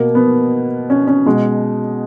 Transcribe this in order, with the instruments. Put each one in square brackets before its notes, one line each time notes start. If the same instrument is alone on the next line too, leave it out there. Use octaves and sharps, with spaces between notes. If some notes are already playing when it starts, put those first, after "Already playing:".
Already playing: [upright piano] B2 A#3
B3
C#4
C#4
B2 G#3